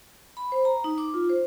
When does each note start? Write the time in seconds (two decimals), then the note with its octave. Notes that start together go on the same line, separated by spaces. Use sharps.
0.37 B5
0.52 C5
0.65 A#5
0.84 D#4
0.98 D6
1.14 F4
1.30 C5